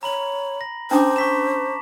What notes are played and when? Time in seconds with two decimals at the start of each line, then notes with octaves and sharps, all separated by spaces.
0.03 C#5 A#5 B5 F#7
0.61 A#6
0.91 C#4 D4 C5 A5 A#5 D6 D#6
1.16 C#6 B6 E7